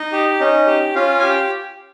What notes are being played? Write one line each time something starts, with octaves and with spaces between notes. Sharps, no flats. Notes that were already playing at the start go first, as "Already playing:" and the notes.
Already playing: D#4 D#5
G4
C#4 D#4 D#5
G4
C#4 F4 F5
G4 G#5
G5